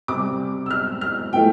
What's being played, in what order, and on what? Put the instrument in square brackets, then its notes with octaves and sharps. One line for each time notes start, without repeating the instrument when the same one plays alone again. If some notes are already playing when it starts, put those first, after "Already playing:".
[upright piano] C3 G3 D6
E6
F6
F6
A2 F3 A3 G5